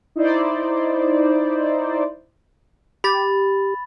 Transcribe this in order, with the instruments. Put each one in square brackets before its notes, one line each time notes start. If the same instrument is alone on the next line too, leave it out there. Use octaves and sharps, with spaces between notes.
[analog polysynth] D#4 E4 C5 D5
[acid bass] G4 [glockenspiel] B5 A6